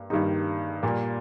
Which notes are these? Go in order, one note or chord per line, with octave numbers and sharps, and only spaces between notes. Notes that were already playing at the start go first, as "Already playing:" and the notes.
Already playing: G2 A#3
G2 D#3 G3 A#3 D#4
A#2 G3 A#3